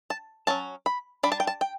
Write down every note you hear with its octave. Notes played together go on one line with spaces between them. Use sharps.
A5
F#3 C#4 A5
B5
G3 D4 B5
A5
G5
A5
G5